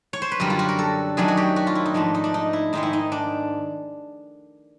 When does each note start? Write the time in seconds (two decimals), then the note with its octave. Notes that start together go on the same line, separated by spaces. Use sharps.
0.13 C#5
0.22 C5
0.32 B4
0.40 F#2 D3 G3 A#4
0.50 F4
0.59 F#4
0.69 A#4
0.79 A4
1.17 F#2 D#3 F#3 A3 D4 G#4
1.28 F#4
1.37 G4
1.56 F#4
1.67 F4
1.75 E4
1.86 D#4
1.94 G#2 F3 A3 D4
2.15 D#4
2.24 D4
2.34 D#4
2.53 E4
2.73 G#2 D#3 G#3 D#4
2.83 E4
2.93 D#4
3.12 D4